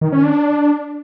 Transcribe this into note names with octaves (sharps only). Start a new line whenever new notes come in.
D#3
C#4
D4